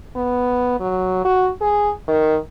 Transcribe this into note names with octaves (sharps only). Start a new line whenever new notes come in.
B3
F#3
F#4
G#4
D#3